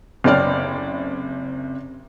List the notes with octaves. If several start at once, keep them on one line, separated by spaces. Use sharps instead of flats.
F#1 C3 C4 C#5 D5 F6